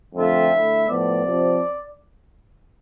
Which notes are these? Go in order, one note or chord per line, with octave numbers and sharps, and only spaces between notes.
F2 D3 A3 C4 F4 E5
D3 A3 E4
A2 F3 B3 D5
C3 F3 C4 F4